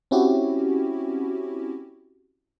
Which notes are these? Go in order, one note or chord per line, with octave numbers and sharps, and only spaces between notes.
C4 C#4 E4 F#4 G4